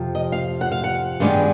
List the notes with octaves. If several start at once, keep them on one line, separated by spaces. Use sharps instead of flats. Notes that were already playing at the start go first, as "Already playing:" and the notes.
Already playing: F2 C3 F3
D#5
F5
F#5
F5
F#5
G2 D#3 G#3 B3 D4 F5